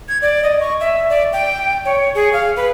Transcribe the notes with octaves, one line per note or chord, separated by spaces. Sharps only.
G#6
D5
D#5
C#6
E5
D5
G5
C#5
G#4
F5
B4